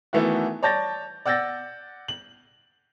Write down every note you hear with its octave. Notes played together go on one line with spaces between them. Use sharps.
D#3 E3 A3 B3 E4 F#4
C#5 D5 A5 G6 A6 A#6
D5 F#5 E6 G6 A6 A#6
F#7